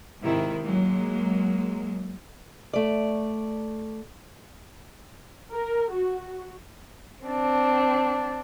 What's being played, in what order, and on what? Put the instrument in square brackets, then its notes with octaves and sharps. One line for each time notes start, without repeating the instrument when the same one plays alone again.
[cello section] G#2 C3 D#3 E4
F#3 G#3 A#3
[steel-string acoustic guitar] A3 D5
[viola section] A#4
F#4
[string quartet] C4 D4